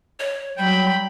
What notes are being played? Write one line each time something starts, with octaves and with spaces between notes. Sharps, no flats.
C#5
F#3 G3 G5 B5